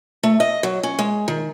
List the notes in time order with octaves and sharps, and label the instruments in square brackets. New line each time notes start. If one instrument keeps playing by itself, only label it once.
[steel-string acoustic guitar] A3
D#5
F#3
C#4
G#3
D#3